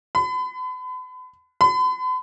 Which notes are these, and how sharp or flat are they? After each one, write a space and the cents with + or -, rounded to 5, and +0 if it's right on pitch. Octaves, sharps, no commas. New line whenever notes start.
B5 +40
B5 +45